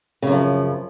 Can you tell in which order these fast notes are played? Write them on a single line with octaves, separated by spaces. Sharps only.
C#3 F#2 F3